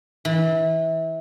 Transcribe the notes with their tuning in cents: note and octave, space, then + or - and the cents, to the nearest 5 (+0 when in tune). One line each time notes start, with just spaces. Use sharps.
E3 -25